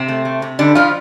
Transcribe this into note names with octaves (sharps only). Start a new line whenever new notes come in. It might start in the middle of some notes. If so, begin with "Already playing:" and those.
Already playing: C3 C4
A3
A3
C3
D3 G3 D4
F3 G3 F4